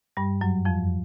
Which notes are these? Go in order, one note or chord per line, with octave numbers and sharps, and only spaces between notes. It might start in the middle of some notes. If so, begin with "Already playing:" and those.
G2 G3
F#2 F#3
F2 F3